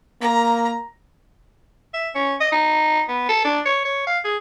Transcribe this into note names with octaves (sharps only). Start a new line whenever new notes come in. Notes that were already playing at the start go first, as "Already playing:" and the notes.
A#3 A#5
E5
C#4
D#5
D#4
B3
A4
D4
C#5
C#5
F5
G#4